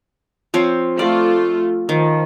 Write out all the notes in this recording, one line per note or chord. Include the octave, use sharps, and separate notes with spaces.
F3 C4 C#5
A3 F4 D5
D#3 F3